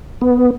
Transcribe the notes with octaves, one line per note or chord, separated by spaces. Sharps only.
B3